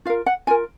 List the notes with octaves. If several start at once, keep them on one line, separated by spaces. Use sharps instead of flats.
F4 A#4 F5
F#5
F4 A#4 G#5